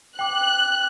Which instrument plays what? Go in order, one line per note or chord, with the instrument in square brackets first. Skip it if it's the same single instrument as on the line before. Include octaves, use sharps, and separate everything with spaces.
[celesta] G5 D6 [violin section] F#6